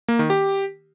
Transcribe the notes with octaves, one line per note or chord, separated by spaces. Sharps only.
A#3
D#3
G4